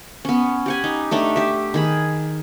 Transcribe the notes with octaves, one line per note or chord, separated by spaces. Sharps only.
B3 C#4
G4 F#5 G#5
D#4
A3 D4 D#4 G4
G4 E5
D#3 G#4 B5